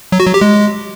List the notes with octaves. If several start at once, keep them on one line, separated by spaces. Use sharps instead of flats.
F#3
F#4
F#3
G4
G#3